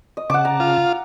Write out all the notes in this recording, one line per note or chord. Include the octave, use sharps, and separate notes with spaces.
D#5
C#3 F#5 A5 D6
A#5
F4